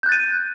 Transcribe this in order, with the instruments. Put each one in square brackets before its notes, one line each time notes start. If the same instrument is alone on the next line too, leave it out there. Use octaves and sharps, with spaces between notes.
[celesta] G6
F#6
A6
D#7